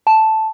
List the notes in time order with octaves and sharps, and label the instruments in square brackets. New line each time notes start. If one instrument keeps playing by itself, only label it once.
[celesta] A5